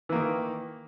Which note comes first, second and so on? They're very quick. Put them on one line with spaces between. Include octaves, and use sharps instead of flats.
E3 A#3 D#3